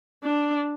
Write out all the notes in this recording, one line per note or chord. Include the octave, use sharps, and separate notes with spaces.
D4